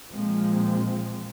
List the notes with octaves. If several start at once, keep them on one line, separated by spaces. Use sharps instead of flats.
A#2 F3 G#3 C4